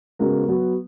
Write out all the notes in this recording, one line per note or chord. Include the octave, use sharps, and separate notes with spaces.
C#3 G#3 B3 F#4 A#4
F#3 B3 F#4